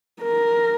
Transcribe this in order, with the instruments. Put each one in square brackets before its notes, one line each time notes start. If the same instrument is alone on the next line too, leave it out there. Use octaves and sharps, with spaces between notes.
[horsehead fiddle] A#4